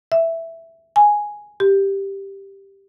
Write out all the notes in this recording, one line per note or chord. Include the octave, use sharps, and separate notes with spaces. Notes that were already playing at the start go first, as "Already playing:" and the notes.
E5
G#5
G4